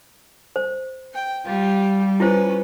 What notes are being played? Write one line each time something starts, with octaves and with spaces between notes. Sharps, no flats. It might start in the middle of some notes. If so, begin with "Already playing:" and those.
C5
G5
G3 F4 G4
C#4 E4 F4 B4 C5